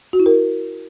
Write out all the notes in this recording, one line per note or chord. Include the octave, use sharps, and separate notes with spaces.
F#4
E4
A#4